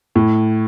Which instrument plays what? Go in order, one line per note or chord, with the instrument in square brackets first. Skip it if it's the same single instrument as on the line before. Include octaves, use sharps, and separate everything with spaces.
[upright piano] A2